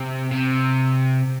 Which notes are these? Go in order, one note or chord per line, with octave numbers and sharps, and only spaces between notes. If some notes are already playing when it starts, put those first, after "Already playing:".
Already playing: C3
C3